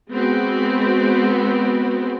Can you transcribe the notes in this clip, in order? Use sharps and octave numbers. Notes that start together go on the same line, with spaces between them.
G#3 B3 C4 F#4